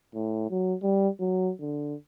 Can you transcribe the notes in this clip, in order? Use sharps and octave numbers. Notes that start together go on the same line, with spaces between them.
A2
F#3
G3
F#3
D3